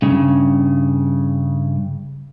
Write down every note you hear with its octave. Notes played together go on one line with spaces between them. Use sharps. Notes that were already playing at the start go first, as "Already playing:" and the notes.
G2 C#3